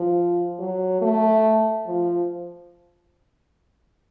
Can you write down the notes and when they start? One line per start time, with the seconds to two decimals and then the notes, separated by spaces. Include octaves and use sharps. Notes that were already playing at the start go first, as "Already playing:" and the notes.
Already playing: F3
0.59 F#3
1.02 A3
1.87 F3